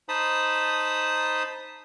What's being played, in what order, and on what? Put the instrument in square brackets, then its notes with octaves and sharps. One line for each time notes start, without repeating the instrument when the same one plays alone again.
[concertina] D#4 C5 A5 B5 D#6